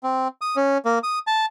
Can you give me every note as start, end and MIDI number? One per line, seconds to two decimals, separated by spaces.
0.03 0.28 60
0.41 0.56 87
0.56 0.78 61
0.85 0.99 58
1.03 1.19 87
1.27 1.46 81